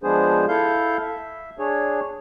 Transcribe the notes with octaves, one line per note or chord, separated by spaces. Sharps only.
F3 G#3 B3 D4 G#4 C5
E4 A4 F5 G6
E5
D4 G#4 C#5